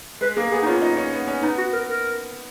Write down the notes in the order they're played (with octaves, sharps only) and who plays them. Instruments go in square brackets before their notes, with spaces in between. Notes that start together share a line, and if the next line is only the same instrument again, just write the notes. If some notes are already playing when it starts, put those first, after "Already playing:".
[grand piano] G#3 [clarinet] B4
[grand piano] A#3 [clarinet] G#4
[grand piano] B3 [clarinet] G#4
[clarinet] D#4
[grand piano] C#4 [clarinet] F4
[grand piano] D#4
C#4
B3
C#4
[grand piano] B3 [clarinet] D#4
[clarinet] F#4
A#4
A#4